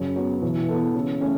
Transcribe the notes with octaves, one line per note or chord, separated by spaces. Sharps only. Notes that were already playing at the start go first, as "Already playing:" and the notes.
Already playing: F#2 C#3
F#3 B3
B2 E3
B3 A4
C#3 E3
A3 C#4